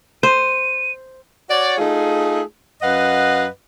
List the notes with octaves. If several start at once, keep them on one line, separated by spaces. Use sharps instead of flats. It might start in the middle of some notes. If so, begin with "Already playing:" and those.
C5 D#7
F#4 C#5 D5
A3 D#4 F4 G#4
F#2 B4 D#5 F5 F#5